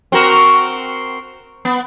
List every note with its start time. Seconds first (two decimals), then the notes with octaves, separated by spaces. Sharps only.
0.12 C4 F#4 A#4
1.65 B3